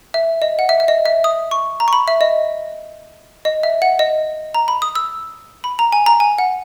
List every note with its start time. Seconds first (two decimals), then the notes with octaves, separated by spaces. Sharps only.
0.14 E5
0.42 D#5
0.59 F#5
0.69 E5
0.80 E5
0.88 D#5
1.06 E5
1.24 D#6
1.51 C#6
1.80 A#5
1.88 C#6
1.93 B5
2.08 E5
2.21 D#5
3.45 D#5
3.63 E5
3.82 F#5
3.99 D#5
4.54 A#5
4.68 B5
4.82 D#6
4.95 E6
5.64 B5
5.79 A#5
5.92 G#5
6.06 A#5
6.20 G#5
6.38 F#5